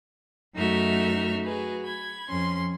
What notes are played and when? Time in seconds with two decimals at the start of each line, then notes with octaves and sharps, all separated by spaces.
0.55 F#2 A3 D#4 F#4 E5 F6
1.44 F#4 G#4 B4
1.82 B5 G#6
2.28 F2 C#4 C6